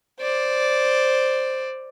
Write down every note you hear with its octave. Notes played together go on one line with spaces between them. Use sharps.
C5 D5